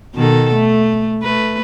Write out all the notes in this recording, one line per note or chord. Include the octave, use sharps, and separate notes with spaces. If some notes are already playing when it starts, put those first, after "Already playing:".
B2 D#3 A4
A3
A3 B4